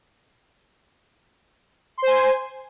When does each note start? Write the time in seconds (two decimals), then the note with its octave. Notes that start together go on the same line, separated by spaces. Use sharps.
1.98 C6
2.02 C5
2.07 G#5